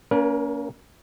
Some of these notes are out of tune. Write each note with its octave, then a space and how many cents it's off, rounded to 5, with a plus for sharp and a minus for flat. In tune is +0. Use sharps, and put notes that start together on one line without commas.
A#3 +0 C#4 +40 A#4 +45